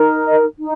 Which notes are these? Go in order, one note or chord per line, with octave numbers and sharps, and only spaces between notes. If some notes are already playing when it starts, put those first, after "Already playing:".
Already playing: D#4 A#4
D#5
D#4